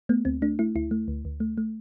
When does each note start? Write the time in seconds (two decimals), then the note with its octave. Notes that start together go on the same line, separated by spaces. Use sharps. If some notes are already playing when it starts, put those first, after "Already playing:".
0.09 A3 B3
0.25 D2 C4
0.42 A3 D4
0.59 A3 E4
0.75 D2 E4
0.91 A3
1.08 D2
1.25 D2
1.40 A3
1.58 A3